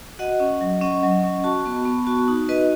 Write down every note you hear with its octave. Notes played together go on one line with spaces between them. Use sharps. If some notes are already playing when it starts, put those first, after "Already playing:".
F#4 D#5 F#5
C#4
F#3
C#4 D#5 F#5
F#3
C#4
F#4 A5 C#6
B3
B3
F#4 A5 C#6
D#4
F#4 B4 D#5